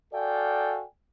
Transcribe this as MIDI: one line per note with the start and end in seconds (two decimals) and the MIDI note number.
0.14 0.84 66
0.14 0.84 69
0.14 0.84 74
0.14 0.84 77
0.14 0.84 79
0.14 0.84 80